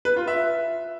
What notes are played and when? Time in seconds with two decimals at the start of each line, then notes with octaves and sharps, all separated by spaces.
0.05 B4
0.16 F4
0.27 E5